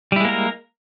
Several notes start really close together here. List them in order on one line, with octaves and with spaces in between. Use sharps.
G3 E4 G#3 A#3 A#4